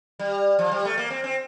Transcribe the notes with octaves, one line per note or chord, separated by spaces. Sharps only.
G3
F3
G3
A3
A#3
C4
C4